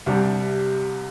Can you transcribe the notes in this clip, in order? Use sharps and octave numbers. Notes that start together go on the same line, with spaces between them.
C2 C3 G3 D4